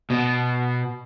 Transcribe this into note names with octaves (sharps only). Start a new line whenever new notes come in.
B2